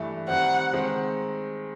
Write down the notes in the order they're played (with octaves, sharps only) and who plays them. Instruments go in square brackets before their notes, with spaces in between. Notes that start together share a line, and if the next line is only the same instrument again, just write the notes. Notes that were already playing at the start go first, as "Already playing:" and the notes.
Already playing: [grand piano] G2 E3 A3
[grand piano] D#3 G3 C4 [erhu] F#5
[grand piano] D#3 G#3 C4